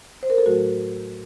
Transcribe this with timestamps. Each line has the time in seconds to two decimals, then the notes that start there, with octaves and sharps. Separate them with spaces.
0.23 C5
0.30 A#4
0.38 A4
0.46 A2 F#3 A3 F#4